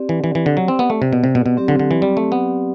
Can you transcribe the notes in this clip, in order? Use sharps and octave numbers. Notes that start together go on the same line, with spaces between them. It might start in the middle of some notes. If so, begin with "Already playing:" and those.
Already playing: C4 G4 D5
E3
E3
E3
D3
F#3
C4
B3
A3
C3
B2
C3
B2
B2
F#3 C4 G4 D5
D3
D3
E3
G3
A3
B3